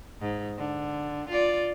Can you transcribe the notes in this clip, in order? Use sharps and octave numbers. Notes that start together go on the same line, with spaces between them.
G#2
D3
F4 D5